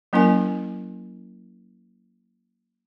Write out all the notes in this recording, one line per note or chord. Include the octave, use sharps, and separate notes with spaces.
F#3 A#3 C#4 E4 A#4 G#5